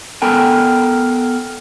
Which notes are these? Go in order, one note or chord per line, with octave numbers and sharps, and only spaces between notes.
B3 A4 A#4 G5 G#5